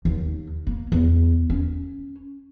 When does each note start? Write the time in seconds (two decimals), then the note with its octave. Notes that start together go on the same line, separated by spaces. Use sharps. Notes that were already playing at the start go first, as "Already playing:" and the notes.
0.05 D#2
0.67 A#3
0.92 E2
1.50 C#4